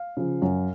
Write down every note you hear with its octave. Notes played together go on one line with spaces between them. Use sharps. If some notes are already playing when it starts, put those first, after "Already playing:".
Already playing: F5
C#3 F3
F#2